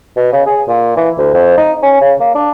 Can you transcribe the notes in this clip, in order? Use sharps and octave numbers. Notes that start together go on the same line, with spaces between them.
B2
C#3
G#4
A#2
E3
D2
F2
D#4
C#4
C#3
A#3
D4